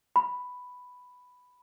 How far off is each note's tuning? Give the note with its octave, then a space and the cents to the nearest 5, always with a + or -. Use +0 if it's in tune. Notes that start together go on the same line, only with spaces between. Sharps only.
B5 +5